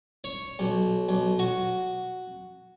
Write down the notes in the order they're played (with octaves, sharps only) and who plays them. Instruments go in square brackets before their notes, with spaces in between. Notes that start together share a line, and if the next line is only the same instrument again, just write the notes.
[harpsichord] C#5
B1
B1
F#4